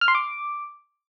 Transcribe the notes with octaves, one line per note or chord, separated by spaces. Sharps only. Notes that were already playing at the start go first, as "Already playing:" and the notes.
F6
C6
D6